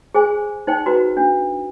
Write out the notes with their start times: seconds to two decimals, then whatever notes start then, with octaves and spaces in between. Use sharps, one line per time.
0.15 G#4 C5 G#5
0.67 D#4 C5 G5
0.86 F#4 B4 A#5
1.17 D4